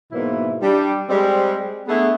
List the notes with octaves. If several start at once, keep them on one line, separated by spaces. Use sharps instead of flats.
G#2 B2 E3 F#3 A#3 E4
G3 D4
G3 G#3 C4
A3 B3 D4 E4 G#4